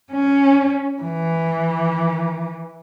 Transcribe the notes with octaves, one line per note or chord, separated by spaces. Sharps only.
C#4
E3